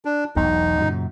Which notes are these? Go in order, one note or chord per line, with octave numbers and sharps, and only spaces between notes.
D4
E1 B1 E2 D#4
F#2 A#2 C#3